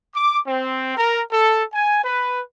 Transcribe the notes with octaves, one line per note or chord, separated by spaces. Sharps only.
D6
C4
A#4
A4
G#5
B4